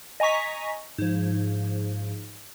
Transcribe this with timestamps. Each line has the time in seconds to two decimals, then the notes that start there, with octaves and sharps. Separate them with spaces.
0.20 D#5 G#5 A#5 C#6 B6
0.98 G#2 F3